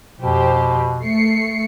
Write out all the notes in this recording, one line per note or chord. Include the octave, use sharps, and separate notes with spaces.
F2 B2 G4 C5
A3 C7 C#7